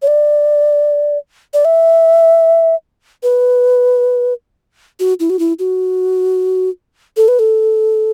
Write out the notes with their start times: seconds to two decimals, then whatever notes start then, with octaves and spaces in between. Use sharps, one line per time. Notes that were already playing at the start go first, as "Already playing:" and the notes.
0.02 C#5
0.07 D5
1.54 D5
1.65 E5
3.23 B4
5.00 F#4
5.20 E4
5.30 F#4
5.39 E4
5.59 F#4
7.17 A4
7.28 B4
7.39 A4